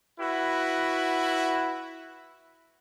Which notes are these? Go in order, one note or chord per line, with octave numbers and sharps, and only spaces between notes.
E4 F#4 B4